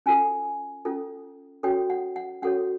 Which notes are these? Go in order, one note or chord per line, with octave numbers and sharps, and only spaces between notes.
C#4 F4 A4 G#5
C#4 F4 A4
C#4 F#4 A4 C#5 G5
F#5
F#5
C#4 F#4 A4 C#5 F#5